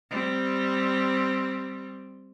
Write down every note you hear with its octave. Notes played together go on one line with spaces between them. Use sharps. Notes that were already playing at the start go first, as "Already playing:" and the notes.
G3 C4